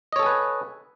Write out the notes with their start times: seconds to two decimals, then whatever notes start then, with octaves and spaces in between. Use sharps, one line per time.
0.12 D#5
0.16 C#5
0.19 A4
0.23 G#5
0.26 B4